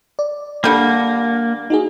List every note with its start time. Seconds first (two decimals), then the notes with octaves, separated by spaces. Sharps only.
0.19 D5
0.64 D3 G3 A#3
1.70 D#4 F#4 G#4